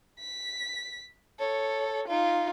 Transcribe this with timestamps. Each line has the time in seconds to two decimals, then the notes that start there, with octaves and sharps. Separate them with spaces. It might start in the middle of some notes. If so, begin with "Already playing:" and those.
0.19 B6
1.40 A4 C#5
2.08 D#4 F4